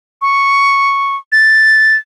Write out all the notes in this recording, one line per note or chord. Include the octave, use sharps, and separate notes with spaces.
C#6
A6